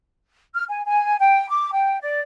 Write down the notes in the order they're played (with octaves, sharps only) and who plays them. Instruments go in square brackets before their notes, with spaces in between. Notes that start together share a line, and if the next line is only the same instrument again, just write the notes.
[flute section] F6
G#5
G#5
G5
D6
G5
D5